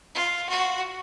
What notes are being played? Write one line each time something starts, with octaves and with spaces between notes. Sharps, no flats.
F4
F#4